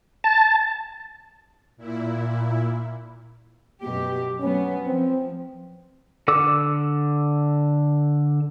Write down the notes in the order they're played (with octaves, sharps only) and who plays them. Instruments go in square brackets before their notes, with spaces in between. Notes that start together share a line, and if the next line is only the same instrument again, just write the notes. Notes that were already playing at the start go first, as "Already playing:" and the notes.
[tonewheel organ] A5
[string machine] A#2 E4
[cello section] F#2 B2 G4
[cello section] F#3 A3 B3 [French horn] C#4
[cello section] F3 [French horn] C4
[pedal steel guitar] D3 A4 D6 E6